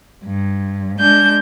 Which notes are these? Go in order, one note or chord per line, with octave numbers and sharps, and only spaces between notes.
G2
G#3 D4 G6